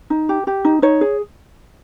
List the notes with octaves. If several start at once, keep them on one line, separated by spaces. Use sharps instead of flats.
D#4
G4
G4
D#4
D#4 C#5
G#4